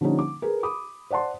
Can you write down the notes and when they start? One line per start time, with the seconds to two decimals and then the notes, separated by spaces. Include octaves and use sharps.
0.01 D3 F3 G3 A#3 C#4 D#4
0.19 D6
0.42 G#4 A#4 B4
0.63 B5 D6 D#6
1.10 C5 D5 F#5 A5 C6